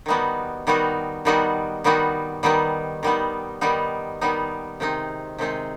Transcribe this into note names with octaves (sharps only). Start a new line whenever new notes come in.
D#3 G3 B3 D#4 F#4
D#3 G3 B3 D#4 F#4
D#3 G3 B3 D#4 F#4
D#3 G3 B3 D#4 F#4
D#3 G3 B3 D#4
D#3 G3 B3 D#4
D#3 G3 B3 D#4
D#3 G3 B3 D#4
C3 D#3 G#3 C4 D#4
C3 D#3 G#3 C4 D#4